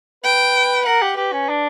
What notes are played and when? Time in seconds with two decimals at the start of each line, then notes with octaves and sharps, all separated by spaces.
0.24 B4 G5
0.86 A#4 F#5
1.02 G4
1.17 G4 B4
1.33 C#4
1.49 D4